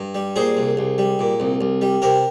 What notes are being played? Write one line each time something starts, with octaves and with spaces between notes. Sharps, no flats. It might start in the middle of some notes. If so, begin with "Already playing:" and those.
Already playing: G2
G3
A#2 G#4 C5
C2
C2
G3
A#2
C2
C2
G3
C3 G4 A#4